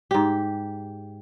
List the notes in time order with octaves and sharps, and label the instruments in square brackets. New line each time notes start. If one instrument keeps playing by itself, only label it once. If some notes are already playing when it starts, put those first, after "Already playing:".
[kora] G#2 G4